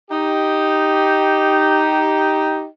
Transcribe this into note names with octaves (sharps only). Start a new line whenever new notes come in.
D#4 G4